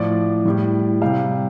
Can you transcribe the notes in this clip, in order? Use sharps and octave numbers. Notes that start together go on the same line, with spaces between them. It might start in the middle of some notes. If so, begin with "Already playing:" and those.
Already playing: A2 F3 D5
A2 G3
C3 G3 F5